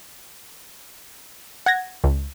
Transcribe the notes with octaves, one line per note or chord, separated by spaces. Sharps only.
F#5 G#6 A#6
C#2